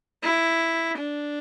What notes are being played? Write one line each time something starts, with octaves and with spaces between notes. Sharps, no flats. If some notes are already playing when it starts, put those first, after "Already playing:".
E4
D4